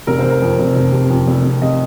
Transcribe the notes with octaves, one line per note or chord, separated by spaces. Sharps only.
F1 A#4
C5
C3
A#4
F2
F1
F1
C3
F2
F1
F1
C3 D#5